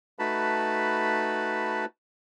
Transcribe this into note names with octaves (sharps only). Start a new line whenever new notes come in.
A3 D#4 F#4 B4 A5 B5